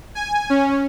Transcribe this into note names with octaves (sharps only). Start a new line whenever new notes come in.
G#5
C#4